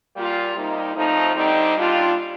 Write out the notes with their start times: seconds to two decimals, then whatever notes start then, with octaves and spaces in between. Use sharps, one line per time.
0.14 A#2 G3 A#3 F4
0.55 C3 G3 A#3 D#4
0.95 A2 F3 A3 C4 D#4
1.34 D3 G3 C4 D#4
1.74 A#2 G3 D4 F4